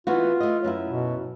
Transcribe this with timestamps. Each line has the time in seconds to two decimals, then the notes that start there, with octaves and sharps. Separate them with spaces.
0.07 E3 B3 F4 F#4
0.40 A3 D#5
0.64 F#2 B3 E4
0.87 B2